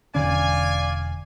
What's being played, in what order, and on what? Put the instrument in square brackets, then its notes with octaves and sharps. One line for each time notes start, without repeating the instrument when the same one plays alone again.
[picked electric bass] E1 D3 C#4 [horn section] D5 F5 G#5